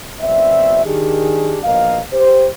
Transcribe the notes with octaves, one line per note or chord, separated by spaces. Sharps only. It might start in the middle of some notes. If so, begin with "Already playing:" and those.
F#1 B2 C4 D5 E5
D#3 D4 G4 G#4
A#1 B2 A#4 D#5 F5
G4 C5